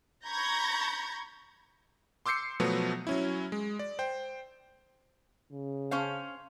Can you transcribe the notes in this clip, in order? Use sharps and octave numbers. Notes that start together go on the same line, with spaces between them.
A#5 B5 C#6 G6 G#6 A#6
C6 D6 E6 G6 C7 C#7
B2 F3 F#3 A3 B3
F#3 C#4 E4
G#3
D5
C5 G5
C#3
C#4 C5 F5